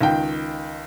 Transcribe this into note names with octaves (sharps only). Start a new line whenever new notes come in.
C#2 D#3 G5